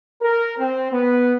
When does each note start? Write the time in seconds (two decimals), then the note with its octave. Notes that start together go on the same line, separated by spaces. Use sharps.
0.22 A#4
0.58 C4
0.91 B3